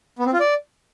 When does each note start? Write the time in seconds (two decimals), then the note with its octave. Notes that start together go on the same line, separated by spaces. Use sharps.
0.19 B3
0.26 C4
0.33 F4
0.40 D5